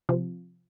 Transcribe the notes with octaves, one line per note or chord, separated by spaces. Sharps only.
C3 F3